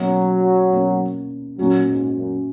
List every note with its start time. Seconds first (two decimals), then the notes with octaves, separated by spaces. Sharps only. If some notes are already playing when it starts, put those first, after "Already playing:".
Already playing: B2 F#3 A#3 C#4
0.72 B2 A#3 C#4
1.58 A#2 F#3 A#3 C#4 F#4
1.87 G#2
2.16 F#2